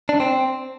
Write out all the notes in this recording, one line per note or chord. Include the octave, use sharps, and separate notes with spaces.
D4
C4